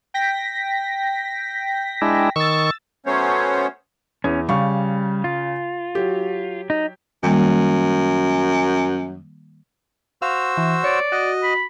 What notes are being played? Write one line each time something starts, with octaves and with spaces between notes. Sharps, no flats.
G5 A#6 B6
G#3 D4 E4
D#3 C#6 E6 A6
F#3 A3 B3 C#4 C5 C#5
E2 C#4
C#3 G3 F5 C#6
F4
F#3 G4
D#4
F#2 D#3 G3 A#3
F#4 C5 F5 E6
E3
C#5 D5
F#4 D#5
B5